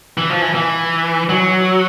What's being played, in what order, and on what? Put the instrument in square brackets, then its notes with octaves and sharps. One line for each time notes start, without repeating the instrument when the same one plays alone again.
[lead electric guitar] E3
F3
E3
E3
F#3